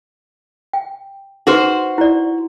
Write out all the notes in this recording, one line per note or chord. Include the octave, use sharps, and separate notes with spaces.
G5
D#4 F#4 G#4 B4 C5
E4 D5